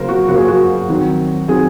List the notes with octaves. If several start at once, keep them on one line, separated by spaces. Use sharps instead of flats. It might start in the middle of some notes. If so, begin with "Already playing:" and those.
Already playing: C#3 F#3 A#3 A#4 C5
F#4
C#3 F#3 A#3 F#4
G#4
F#4
D#3 F#3 C4
D#3 F#3 C4 G#4